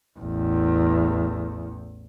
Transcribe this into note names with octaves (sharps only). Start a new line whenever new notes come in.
A1 E2